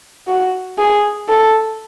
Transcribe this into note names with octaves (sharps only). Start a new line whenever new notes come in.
F#4
G#4
A4